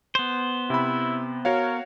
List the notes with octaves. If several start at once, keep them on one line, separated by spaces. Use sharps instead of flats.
B3 C5
C3 E4 B5
F#4 A#4 C#5 F5